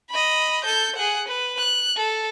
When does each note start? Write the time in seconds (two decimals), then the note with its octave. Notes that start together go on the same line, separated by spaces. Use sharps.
0.10 D#5 B5
0.64 A4 G6
0.96 G#4 F#5
1.28 B4
1.59 F#6
1.97 A4